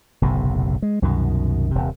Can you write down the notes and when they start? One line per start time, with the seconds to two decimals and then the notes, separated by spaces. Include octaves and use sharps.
0.22 F#1 B1 A2 C3
0.82 G#3
1.02 C2 F#2 B2 D#3
1.71 D#1 C3